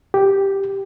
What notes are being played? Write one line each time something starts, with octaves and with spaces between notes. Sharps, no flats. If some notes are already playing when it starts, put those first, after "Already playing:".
G4